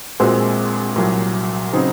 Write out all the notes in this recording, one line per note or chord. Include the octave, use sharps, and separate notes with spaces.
A#1 A#2 G#3 C4 F#4
C2 A#2 F#3
C#3 F#3 C4 D#4